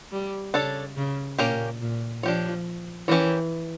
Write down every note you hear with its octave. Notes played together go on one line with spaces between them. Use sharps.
G3
C#3 D4 A4 C#5
C#3
A#2 A#3 C#4 G4 A#4
A#2
F3 D4 G4 C#5
E3 C#4 G4 A#4 C#5